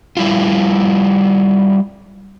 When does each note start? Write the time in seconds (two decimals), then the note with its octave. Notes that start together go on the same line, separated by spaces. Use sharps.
0.17 G3 E4 F4